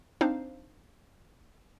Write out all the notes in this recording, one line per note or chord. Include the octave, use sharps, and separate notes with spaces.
C4 D4 D#4 C5 F5